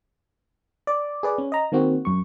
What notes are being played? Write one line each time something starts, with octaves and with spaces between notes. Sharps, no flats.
D5
G#4 B4 D5
C#4
D#5 A#5
D#3 A#3 C4 F#4
F#2 C#6